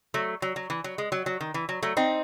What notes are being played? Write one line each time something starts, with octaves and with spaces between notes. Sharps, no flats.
F#3 A3
F#3
F#3
E3
F#3
G#3
F#3
F#3
D#3
E3
F#3
F#3 A3
C4 D#4